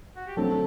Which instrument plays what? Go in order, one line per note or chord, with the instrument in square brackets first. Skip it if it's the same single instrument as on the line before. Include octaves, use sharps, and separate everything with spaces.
[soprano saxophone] F#4
G4
[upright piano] D3 F#3 A3 C4 [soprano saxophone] A4